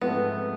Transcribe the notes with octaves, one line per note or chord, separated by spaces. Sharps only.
G#2 F3 A3 B3 C4